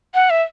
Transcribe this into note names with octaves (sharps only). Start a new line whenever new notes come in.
F#5
E5